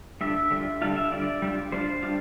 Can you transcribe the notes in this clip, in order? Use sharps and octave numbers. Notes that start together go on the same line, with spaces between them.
D3 G3 D4 F4 E5
D3 G3 D4 F4
D3 G3 D4 F4 F5
E5
D3 G3 D4 F4 D5
G3 D4 F4
G3 D4 F4 C5
G3 D4 F4